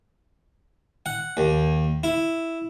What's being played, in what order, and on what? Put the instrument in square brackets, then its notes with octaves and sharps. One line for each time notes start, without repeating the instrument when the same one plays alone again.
[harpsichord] F#5
D#2
E4